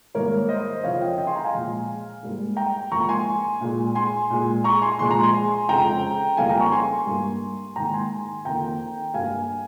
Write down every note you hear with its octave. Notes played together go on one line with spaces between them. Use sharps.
G#2 D#3 G3 A#3 A#4 C#5
C5 D#5
F2 C#3 F3 C#5 F5
D#5 G5
D#5 G5
G#5 C6
G5 A#5
F5 G#5
A#2 F3 G#3
G#2 G3 A#3
G5 A#5
G#2 F3 A#3 A#5 C#6
G#5 C6
A#2 G#3
G#5 C6
A#2 G#3
A#5 C#6
G#5 C6
A#2 F3 G#3 C6
A#5
G#5 C6
F2 C#3 G#3 G5 A#5
F2 C#3 G3 A#3 F5 G#5
G5 A#5
A#5 C#6
G#5 C6
G2 G3 A#3
G#2 D#3 A#3 G5 A#5
G#5 C6
F2 D#3 A#3 G5 A#5
G2 G3 A#3 F5 G#5